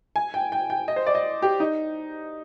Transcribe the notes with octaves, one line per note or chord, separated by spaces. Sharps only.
G#5
G5
G5
G5
D#5
C5
D5
D#5
G4
D#4